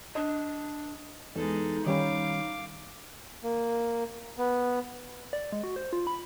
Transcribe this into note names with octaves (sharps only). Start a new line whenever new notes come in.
D4 D#5 D#6
E2 G#3 D#4 A4
D#3 G3 C#4 C#5 F5 B5 D6
A#3
B3
D5
G#3
F#4
C5
F4
B5